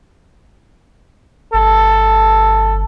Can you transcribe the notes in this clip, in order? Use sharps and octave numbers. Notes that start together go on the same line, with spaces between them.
G1 A4